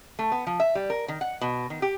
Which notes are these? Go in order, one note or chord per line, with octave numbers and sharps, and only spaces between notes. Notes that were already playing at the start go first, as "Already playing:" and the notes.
A3
B3
F3
E5
G3
A#4
D#3
F#5
B2
D#3
G4